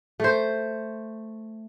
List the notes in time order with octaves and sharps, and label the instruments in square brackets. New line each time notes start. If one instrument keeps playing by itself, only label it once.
[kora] A3 C5